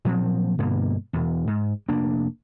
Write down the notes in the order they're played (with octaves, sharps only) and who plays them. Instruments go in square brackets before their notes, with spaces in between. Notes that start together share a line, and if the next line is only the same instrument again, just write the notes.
[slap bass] A#2 F3 F#3 C4
G2 B2 D3 A#3
E1 E2
G#2
F1 A#3 D4